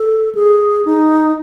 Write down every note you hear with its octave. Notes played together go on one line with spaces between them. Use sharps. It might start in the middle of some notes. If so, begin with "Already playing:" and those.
Already playing: A4
G#4
D#4